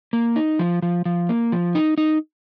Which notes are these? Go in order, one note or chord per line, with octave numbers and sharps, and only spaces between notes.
A#3
D#4
F3
F3
F3
A#3
F3
D#4
D#4